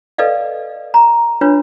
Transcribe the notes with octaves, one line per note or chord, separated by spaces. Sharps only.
A4 B4 D5 D#5 F5
A#5
D4 F4 B4 C#5